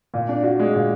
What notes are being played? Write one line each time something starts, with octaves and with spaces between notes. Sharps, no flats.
A#2
D4
F#4
G#3
A#2